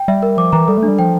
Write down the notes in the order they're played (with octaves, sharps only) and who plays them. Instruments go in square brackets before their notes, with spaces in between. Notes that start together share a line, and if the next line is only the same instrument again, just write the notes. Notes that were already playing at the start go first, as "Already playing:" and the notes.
Already playing: [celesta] G5
[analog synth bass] G3 [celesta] E5
[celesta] A#4
[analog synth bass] F3 [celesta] D6
[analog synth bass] E3 [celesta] A#5
[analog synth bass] G3 [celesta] A4
[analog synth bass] A3
[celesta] D4
[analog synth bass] G3
[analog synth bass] F3 [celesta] G5